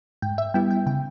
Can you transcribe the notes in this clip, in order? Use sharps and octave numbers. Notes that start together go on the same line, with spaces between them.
G#2 G5
E5
G3 B3 E4 G5
G5
C#3 G5